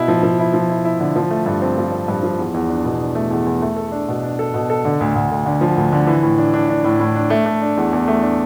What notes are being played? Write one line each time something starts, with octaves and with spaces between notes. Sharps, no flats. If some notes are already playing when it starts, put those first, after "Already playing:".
Already playing: B2 E4
F3
F3
E4
F3
E4
E4
D3
F3
A3
G2
C4
F3
C4
G2
F3
E2
E2
D4
B2
D4
A3
E2
E2
A3
A4
D4
B2
D4
A4
B2
A4
D3
D2
D2
D2
D3
F3
D2
D3
E3
A2
D4
D4
D4
A2
A2
D4
A3
A3
D4
E2
E2
A3
D4